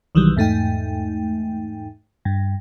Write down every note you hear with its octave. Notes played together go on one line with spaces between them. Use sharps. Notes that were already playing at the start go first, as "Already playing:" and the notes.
B1 D#3 E3 F#3 G3
E2 G#2 A3 D#4 G5
G2